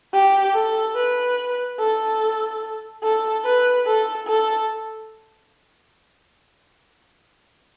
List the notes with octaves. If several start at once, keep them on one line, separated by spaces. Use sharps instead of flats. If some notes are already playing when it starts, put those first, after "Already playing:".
G4
A4
B4
A4
A4
B4
A4
A4